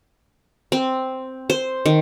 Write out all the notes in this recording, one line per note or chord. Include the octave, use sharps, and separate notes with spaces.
C4
C5
D#3